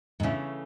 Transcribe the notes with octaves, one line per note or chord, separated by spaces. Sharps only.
G#2
A2 C#3 E3 A3 C#4